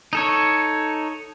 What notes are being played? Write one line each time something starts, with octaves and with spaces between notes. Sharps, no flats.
D#4 A4 C#5